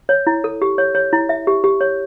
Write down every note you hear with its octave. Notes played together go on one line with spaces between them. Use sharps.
C#5
E4
A4
G4
C#5
C#5
E4
E5
G4
G4
C#5